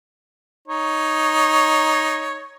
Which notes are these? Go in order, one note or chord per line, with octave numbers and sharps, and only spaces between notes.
D#4 C#5